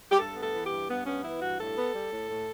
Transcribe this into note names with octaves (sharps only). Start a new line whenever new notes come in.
G4
G2 A4
B3
A4
E3
G4
G2
G2 B3
B3 C#4
E3 E4
G2 F#4
A2 A4
B3
G3
A2
A2